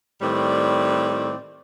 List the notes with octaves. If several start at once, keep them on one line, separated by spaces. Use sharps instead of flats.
A2 D#3 G3 C4 D5